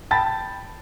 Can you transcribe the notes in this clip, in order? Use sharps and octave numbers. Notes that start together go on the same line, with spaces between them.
G5 A5 B5 A6